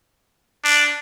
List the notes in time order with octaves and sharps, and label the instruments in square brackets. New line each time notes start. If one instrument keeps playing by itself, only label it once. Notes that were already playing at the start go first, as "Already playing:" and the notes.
[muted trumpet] D4